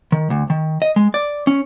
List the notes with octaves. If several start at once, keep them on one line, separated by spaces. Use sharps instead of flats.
D#3
D2
D#3
D#5
G#3
D5
C#4